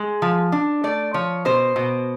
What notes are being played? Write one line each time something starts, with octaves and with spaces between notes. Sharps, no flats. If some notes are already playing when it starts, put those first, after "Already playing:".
Already playing: G#3
F3
D4
A3 D5
F3 C#5
B2 C5
B2